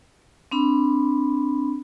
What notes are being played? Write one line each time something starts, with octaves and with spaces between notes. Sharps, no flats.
C4 D4 B5